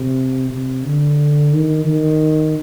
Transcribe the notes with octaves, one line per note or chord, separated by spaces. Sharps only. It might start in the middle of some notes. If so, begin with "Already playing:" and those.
Already playing: C3
C3
D3
D#3
D#3